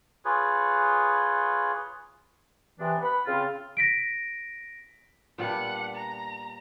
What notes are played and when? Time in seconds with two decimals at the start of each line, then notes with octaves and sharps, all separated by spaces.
0.25 F4 G#4 B4 C#5
2.79 C3 E3 B3 D4
3.02 B4 F#5 B5
3.26 C#3 C4 F4
3.77 A#6 B6 D7
5.38 A#2 G3 B3 D4 F#5
5.95 A#5